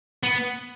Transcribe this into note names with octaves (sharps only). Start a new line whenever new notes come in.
B3